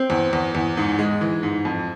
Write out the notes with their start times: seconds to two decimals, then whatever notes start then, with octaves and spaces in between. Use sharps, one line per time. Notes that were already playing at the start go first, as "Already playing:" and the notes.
Already playing: C4
0.10 E2
0.33 E2
0.55 E2
0.77 G#2
0.99 G#3
1.21 E3
1.43 G#2
1.65 F2